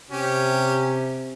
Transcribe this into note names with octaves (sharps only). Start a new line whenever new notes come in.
C3 C#4 G4